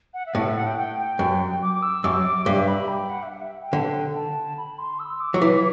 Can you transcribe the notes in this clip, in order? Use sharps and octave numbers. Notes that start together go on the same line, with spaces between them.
F#5
E5
A2 F#5
E5
F#5
G5
G5
G5
F#2
D6
E6
F#2 D6
G2 E5
B5
G5
F#5
E5
F#5
E5
G5
D3
A5
B5
C6
E6
D6
F#3
E3 D6